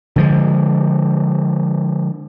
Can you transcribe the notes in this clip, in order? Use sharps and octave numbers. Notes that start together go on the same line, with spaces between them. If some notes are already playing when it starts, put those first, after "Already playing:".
D3 F3 G#3